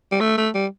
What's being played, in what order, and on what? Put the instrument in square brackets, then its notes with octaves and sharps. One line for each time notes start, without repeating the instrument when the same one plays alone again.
[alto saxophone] G3
A3
A3
G3